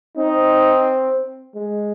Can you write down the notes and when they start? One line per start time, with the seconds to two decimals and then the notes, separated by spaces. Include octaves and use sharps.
0.17 C4 D#4
1.55 G#3